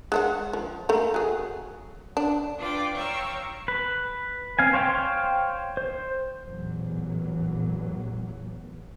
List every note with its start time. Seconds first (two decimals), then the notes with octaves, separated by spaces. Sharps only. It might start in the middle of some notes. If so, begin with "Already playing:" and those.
0.12 G#3 A4 F#5
0.53 F3
0.89 A3 A#3
1.14 F#3 G#4
2.17 D4
2.59 D4 F4 B4 D5 G5 D6
2.96 C#5 F5 G5 A#5 C#6 E6
3.68 B4
4.59 C4 F5 G#5
4.73 C5 C#5 F5 G5 C6
5.77 C5
6.44 A1 E2 A#2 F#3